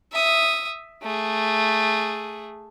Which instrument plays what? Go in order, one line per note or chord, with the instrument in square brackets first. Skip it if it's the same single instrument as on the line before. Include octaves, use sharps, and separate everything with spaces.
[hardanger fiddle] E5 D#6
A3 G#4